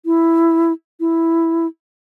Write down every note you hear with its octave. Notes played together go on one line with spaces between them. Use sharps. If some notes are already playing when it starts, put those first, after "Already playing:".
E4
E4